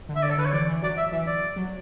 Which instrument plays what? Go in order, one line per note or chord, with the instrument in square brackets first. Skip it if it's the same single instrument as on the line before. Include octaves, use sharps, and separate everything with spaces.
[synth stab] D3
[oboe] E5
[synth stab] D3 [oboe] D5
[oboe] A4
[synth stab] D3 [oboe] B4
[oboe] C#5
[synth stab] E3 [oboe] D5
[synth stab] E3
[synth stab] F#3 [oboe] D5
[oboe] E5
[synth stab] E3 [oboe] E5
[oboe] D5
[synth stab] F#3